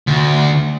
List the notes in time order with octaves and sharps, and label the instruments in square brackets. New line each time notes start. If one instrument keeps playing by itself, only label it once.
[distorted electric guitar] D2